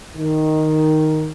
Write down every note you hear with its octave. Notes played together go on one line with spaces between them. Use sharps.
D#3